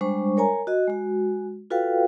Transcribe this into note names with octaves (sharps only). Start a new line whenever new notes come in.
G3 G#3 D4 C5 C#6
A#4 C#5 G#5 A#5
F#4 D#5
G#3 F#4
F4 F#4 A4 B4 F5 G5